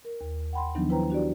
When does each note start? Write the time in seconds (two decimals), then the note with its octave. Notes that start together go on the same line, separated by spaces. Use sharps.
0.05 A#4
0.21 D#2
0.53 F#5 G5 B5 C6
0.75 D#3 F3 F#3 B3 D4 D#4
0.90 E4 B4 C5 G5 A#5
1.10 D4 F#4 G4 D5